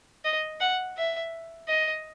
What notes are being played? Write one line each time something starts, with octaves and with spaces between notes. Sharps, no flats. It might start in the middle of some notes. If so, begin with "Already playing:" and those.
D#5
F#5
E5
D#5